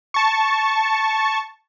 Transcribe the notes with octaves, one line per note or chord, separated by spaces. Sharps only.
A5 C#6